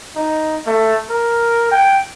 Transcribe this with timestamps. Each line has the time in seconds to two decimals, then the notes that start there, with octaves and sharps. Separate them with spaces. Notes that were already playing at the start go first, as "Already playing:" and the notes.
0.16 D#4
0.66 A3
1.10 A#4
1.71 G5